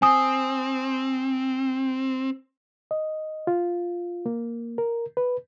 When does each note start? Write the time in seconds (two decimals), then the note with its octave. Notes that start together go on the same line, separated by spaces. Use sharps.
0.02 C4 G#5 D#6
2.91 D#5
3.47 F4
4.26 A#3
4.78 A#4
5.17 B4